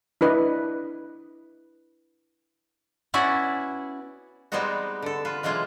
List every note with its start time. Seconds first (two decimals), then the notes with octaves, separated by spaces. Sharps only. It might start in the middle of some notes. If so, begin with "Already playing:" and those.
0.21 D4 E4 B4 D#5
3.14 B3 C#4 E4 F#4 D5
4.52 G3 G#3 B3 C4 D#4 F#4
5.02 D3 A4
5.25 F4 B4
5.43 B2 E3 F#3 G#3 F4